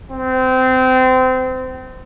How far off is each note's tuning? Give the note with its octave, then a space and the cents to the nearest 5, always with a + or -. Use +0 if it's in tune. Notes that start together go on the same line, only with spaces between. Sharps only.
C4 -25